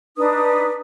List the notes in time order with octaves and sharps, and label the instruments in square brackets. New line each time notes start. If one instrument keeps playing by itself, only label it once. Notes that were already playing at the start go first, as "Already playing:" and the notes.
[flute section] D4 D#4 B4 D#6